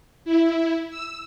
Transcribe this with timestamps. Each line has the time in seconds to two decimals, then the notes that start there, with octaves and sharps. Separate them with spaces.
0.25 E4
0.90 E6